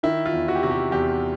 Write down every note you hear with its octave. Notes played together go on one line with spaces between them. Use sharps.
D#3 E4
F4
E2
F#4
G4
C3 F#4
G4
E2 G4